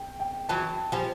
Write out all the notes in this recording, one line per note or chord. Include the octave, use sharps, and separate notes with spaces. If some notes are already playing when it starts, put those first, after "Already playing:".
Already playing: G5
G5
E3 F#3 A5
F3 G3 G#5